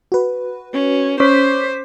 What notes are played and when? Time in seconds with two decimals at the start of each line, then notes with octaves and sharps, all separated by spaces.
0.12 F#4 B4
0.73 C#4
1.20 C#4 C5 D6 B6